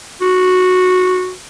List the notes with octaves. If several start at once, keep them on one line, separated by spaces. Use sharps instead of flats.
F#4